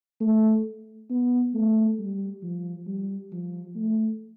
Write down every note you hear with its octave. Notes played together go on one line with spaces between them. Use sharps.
A3
B3
A3
G3
F3
G3
F3
A3